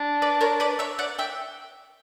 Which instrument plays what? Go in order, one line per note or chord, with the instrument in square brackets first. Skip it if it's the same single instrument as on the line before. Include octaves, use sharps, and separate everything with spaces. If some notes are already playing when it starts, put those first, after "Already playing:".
Already playing: [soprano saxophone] D4
[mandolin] B4 D5
A#4 C#5
B4 D5
C#5 E5
D5 F#5
E5 G5